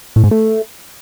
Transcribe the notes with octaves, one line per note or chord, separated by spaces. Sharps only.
A2
G#2
A3